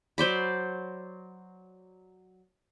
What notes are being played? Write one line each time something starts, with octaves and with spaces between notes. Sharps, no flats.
F#3 C5 D5 B5